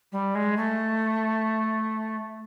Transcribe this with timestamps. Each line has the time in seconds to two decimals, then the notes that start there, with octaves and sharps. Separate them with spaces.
0.12 G3
0.35 G#3
0.57 A3